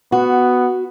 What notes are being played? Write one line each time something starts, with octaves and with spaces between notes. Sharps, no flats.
B3 F#4